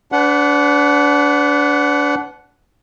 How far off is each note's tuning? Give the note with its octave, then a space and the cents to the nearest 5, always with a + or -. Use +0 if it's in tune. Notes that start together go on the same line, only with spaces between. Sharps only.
D4 -30 B4 +30 F#5 +0